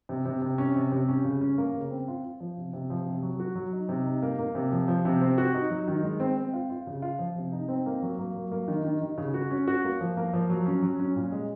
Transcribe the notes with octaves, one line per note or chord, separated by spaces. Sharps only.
C3
C3
C3
C#4
C3
C3
C#4
C#3
C#4
A#3
C#3
C4
F4
F4
F3
C3
C3
F3
C3
F#3
F#4
F#3
D#4
C3
D#4
A#3
A#3
C3
F3
F3
C3
C4
F#4
D#4
F#3
D#3
G#3
C4
C4
F4
F4
C#3
F4
F3
C3
D#4
C4
A#3
F#3
A#3
F#3
A#3
D#3
D#3
D#3
C#3
F#4
C#4
F#4
A#3
F3
A#3
F3
F#3
C#4
F#3
C#4
A#2
G#3